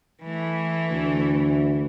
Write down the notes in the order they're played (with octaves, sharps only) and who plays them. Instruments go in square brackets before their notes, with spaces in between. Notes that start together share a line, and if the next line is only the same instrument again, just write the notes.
[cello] E3 A3
[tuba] D2